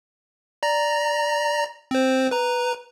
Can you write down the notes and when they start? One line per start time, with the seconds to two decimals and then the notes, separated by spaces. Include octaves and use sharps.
0.63 D5 A#5 A#6
1.91 C4 C5
2.31 B4 A#5